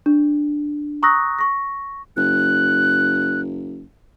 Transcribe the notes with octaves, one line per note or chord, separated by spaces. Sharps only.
D4
A#5 C#6 D#6 E6 F#6 A#6
C#6 A#6
F#1 F#6